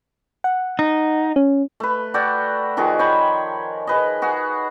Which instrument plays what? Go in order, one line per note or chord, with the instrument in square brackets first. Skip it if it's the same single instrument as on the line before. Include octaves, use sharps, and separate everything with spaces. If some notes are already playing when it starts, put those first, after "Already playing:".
[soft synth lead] F#5
[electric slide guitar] D#4
[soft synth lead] C#4
[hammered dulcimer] A3 B4
F#4 A4 D5 G5
D#3 F3 F#4 G#4
C#5 G5 G#5 B5
G#4 B4 D#5
F#4 G#4